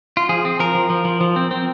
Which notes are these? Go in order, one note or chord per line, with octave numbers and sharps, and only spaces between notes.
F4
F3 G#4
C4
F3 A#4
F3
F3
F3
F3
C4
C4